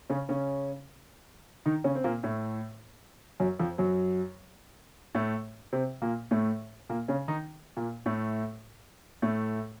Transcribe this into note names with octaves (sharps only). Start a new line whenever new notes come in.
C#3 C#4
C#3 C#4
D#3 D#4
C#3 C#4
C4
A#2 A#3
A2 A3
F#2 F#3
F2 F3
F#2 F#3
A2 A3
C3 C4
A#2 A#3
A2 A3
A#2 A#3
C#3 C#4
D#3 D#4
A#2 A#3
A2 A3
A2 A3